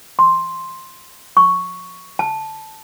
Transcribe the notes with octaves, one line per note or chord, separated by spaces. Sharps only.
C6
C#6
A5